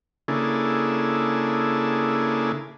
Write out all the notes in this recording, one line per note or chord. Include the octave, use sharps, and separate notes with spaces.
C#3 A#3 D4 E4 G#4 A4